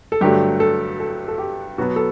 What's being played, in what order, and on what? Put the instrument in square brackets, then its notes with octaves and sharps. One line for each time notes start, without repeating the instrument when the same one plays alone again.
[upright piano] A4
G2 D3 F#3 A3 G4
A4
A4
A4
G4
B2 F#3 B3 F#4
A4